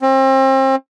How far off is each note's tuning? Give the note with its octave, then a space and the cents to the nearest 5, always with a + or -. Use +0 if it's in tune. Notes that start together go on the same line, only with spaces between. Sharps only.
C4 +35